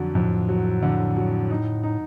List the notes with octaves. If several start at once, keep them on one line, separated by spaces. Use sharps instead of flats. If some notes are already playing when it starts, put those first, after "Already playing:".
Already playing: F2 D3 F#3
F2 A2
F#3
D3
F#3
D#4
D#4